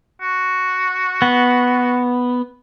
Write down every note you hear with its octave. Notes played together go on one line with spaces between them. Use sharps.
F#4
B3